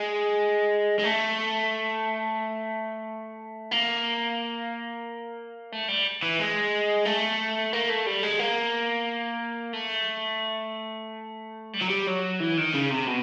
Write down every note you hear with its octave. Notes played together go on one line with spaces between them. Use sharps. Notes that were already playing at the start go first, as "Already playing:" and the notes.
Already playing: G#3
G#3
A3
A#3
A3
G3
E3
G#3
A3
A#3
A3
G3
G#3
A#3
A3
G3
F#3
G3
F#3
E3
D#3
C#3
C3
B2